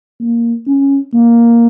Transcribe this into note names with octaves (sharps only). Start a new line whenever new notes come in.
A#3
C#4
A#3